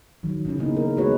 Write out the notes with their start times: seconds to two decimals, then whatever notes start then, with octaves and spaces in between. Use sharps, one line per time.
0.23 D#3 F#3
0.45 C#3 C#4 E4
0.58 C#3 A#3 B3 D#4
0.77 A#4
0.97 G#3 B3 F#4 B4 C#5